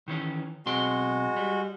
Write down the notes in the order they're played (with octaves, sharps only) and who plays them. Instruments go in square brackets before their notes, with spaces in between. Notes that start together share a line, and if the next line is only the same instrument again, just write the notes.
[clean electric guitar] D#3 E3 C#4
[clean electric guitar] B1 C4 C6 [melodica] G#3 F#4
[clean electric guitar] G3